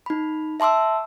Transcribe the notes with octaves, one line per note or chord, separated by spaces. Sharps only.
D#4 B5
E5 A5 C6 D6 E6